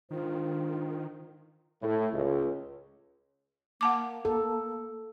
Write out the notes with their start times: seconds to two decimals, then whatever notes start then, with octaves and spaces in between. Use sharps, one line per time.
0.11 G#2 D#3 D4 F4 C5
1.81 A2
2.12 C#2
3.81 A#3 F#5 A5 D6
4.25 A4